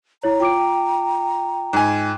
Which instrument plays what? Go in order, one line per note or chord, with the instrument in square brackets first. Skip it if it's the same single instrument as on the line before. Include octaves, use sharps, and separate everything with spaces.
[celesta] E4 C#5 [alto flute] A#5
[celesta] F4 D6 D7 [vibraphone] G5
[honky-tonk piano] G#2 G#5